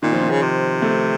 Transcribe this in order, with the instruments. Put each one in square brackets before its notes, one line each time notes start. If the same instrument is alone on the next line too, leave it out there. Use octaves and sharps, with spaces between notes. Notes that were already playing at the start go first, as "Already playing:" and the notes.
[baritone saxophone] A#2 [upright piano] D#3
[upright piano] F3
D#3
[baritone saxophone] C#3
C3
[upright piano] A3